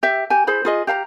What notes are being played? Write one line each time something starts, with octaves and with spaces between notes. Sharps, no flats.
G4 E5
G4 G#5
E4 G#4 C5 B5
F4 G#4 D#5
G4 F5 A5 A#5